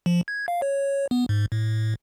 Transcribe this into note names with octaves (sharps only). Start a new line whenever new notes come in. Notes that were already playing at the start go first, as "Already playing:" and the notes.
F3
G#6
F5
C#5
B3
G#2
A2